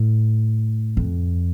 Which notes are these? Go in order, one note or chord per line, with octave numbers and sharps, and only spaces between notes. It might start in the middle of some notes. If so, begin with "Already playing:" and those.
Already playing: A2
F2